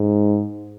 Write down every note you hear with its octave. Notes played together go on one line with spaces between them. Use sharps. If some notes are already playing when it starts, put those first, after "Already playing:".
Already playing: G#2